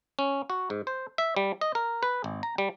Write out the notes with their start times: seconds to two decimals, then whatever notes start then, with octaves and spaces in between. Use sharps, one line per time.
0.19 C#4
0.50 F#4
0.70 G#2
0.87 C5
1.18 E5
1.37 G3
1.61 D#5
1.75 A#4
2.03 B4
2.24 G#1
2.43 A#5
2.58 G3